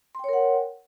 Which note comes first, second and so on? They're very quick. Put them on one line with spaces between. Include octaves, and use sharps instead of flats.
C6 G5 C#5 A#4 F#5